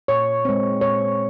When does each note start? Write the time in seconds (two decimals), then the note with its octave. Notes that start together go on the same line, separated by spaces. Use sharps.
0.08 A#2 C#5
0.45 G#3 C4
0.81 A#2 C#5